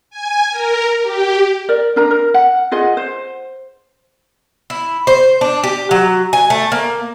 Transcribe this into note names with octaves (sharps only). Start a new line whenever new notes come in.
G#5
A#4
G4
A#4 D5
D4 A#4 A#5
A#4
F#5
F4 G#4 D#5 F#5
C5
E4
C5
D4
G4
F#3
G#5
A3
A#3